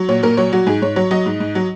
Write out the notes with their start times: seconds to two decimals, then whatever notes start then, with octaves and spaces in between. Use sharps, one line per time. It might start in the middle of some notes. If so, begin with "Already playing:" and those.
Already playing: F#3
0.09 A#2 C#5
0.23 A#2 A#4
0.37 F#3 C#5
0.53 F#3 F#4
0.66 G#2 G#4
0.82 G#2 C#5
0.96 F#3 C#5
1.11 F#3 D#5
1.26 G#2
1.40 G#2
1.55 F#3